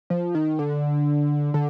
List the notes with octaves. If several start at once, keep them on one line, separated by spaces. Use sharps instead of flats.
F3
D#3
D3
D3